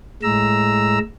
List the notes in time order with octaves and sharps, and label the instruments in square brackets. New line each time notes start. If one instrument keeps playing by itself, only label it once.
[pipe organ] A2 G#3 A#5 E6